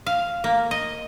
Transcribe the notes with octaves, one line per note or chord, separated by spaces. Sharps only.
F5
A#3
D#5